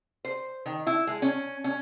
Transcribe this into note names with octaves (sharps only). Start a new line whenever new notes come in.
C5
D#3
E4
G#3
C#4
C#4